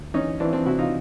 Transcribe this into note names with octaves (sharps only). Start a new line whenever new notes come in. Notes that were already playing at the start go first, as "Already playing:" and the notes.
Already playing: D2
E3 C#4 D#4
E3 C4 D4
C4 D4
C3 E4 F#4
D#4 F4